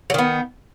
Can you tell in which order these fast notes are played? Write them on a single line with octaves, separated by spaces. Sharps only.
F#3 D#3 B3